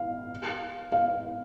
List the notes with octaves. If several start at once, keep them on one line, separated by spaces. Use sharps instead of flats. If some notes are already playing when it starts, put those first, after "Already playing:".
Already playing: F5
F5